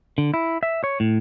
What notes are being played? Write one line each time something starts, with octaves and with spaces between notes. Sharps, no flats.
D3
E4
E5
C#5
A2